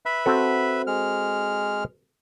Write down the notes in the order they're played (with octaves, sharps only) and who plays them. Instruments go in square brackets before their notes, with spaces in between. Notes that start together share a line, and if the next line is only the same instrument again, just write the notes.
[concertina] B4 E5 B5
[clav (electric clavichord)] C4 F#4 A4
[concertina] G#3 F6